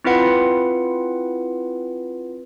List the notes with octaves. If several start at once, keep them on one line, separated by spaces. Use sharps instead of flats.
C4 E4 F4 B4 F#5